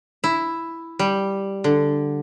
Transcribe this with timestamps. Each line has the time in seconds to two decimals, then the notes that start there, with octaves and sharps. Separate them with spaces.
0.24 E4
0.99 G3
1.64 D3